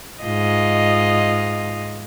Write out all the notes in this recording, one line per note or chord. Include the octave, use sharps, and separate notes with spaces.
G#2 F4 D#5